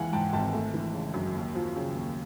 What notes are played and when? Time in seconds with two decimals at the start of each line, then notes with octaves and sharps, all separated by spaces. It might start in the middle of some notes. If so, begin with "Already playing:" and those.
Already playing: D#2 E3 G#3 F5 F#5 G#5
0.13 G#2 G5 A5
0.33 G#1 G5 A5
0.53 A3
0.73 E3
0.93 C#3
1.14 F#2
1.35 D#2
1.55 F3
1.76 C#3
1.95 D#2